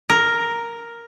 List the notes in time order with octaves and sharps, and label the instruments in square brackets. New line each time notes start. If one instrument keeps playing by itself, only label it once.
[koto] A#4